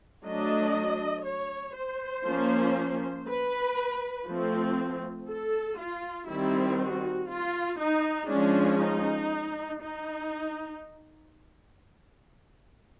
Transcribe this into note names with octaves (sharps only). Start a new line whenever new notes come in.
F#3 A3 D4 D#5
C#5
C5
F3 A#3 C#4
B4
F3 A3 C4
A4
F4
D#3 G3 C4 E4
F#4
F4
D#4
F3 G#3 C#4 D4
D#4
D#4